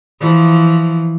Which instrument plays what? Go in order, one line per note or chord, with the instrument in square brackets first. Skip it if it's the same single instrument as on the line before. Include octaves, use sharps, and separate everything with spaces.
[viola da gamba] E3 F3